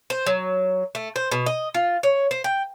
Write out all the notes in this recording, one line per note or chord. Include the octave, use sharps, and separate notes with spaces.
C5
F#3
A3
C5
B2
D#5
F4
C#5
C5
G5